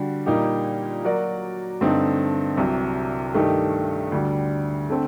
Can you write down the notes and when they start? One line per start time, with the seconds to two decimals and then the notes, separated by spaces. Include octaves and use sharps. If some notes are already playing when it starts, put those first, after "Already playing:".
Already playing: D3 G3 F#4
0.26 A#2 G3 A#3 D#4 G4
1.04 F#3 A#3 F#4 A#4 D5
1.81 G2 D3 A3 C4 D#4
2.57 C2 C3 F#3
3.34 G2 D#3 A3 D#4 G4
4.12 D2 D3 G3
4.90 D3 A3 C4